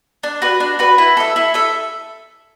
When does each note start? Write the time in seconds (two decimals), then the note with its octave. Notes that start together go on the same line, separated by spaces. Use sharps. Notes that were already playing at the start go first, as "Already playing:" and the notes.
0.23 D4
0.42 F#4 B4
0.60 D4
0.79 F#4 B4
0.98 E4
1.17 A4 E5
1.36 E4
1.54 A4 E5